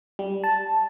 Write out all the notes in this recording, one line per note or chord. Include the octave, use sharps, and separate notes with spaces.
G3
A5